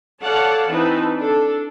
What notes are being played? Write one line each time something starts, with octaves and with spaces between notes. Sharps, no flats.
A4 C#5 D5 F5 F#5 A5
E3 C4 D#4 B4 A5
D4 A4